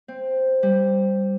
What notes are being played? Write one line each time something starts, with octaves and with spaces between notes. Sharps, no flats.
C4
G3